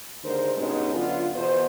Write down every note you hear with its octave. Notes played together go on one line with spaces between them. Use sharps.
D#2 D3 G#3 A#4 C5
G2 B2 G#3 C#4 D#4
F#2 D3 B3 F4
E2 B2 C5